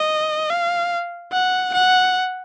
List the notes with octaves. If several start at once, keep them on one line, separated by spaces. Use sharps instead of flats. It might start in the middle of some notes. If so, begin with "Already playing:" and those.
Already playing: D#5
F5
F#5
F#5